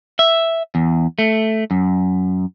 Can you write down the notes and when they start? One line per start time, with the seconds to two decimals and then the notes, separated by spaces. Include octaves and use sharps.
0.19 E5
0.75 E2
1.19 A3
1.71 F#2